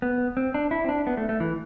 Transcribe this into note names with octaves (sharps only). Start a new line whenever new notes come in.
B3
C4
D4
E4
C4
D4
B3
A3
A3
E3